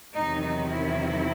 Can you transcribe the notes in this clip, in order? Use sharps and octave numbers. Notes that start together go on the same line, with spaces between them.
E2 C3 D#3 F#3 D#4
D#4
E4